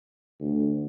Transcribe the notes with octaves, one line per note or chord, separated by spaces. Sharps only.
D2